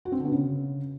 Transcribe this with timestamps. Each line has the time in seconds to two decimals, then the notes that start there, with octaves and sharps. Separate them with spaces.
0.05 F#4
0.12 C4
0.19 D3
0.25 B3
0.32 C#3